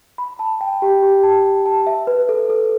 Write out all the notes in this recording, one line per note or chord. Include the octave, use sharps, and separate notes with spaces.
B5
A5
G5
G4
G4
A5
A5
E5
B4
A4
A4